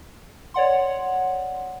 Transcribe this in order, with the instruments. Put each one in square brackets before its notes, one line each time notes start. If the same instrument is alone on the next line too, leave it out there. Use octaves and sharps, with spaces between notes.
[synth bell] C#5 D5 F#5 C6